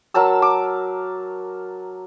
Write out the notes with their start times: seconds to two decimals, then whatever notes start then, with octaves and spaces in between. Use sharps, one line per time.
0.14 F#3 A#4 A5 E6
0.42 D6